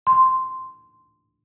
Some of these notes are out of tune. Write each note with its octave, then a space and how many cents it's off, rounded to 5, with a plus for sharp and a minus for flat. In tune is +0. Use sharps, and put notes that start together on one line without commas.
C6 -5